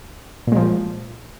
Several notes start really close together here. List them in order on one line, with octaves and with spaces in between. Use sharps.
A#2 G#3 F3